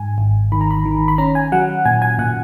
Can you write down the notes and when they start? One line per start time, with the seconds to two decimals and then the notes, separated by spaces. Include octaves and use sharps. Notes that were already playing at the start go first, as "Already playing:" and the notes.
Already playing: G#2 G#5
0.18 G#1
0.52 D#3 B5
0.61 A#5
0.71 B5
0.85 D#3
1.08 B5
1.18 C#4 A#5
1.35 G#5
1.52 F#3 F#5
1.85 A#2 G#5
2.02 G#5
2.19 A#2 F#5